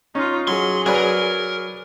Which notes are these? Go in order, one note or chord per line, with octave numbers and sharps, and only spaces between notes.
C#4 D#4 F4
F#3 G#4 C6
F#3 A#4 B4 D5 G#5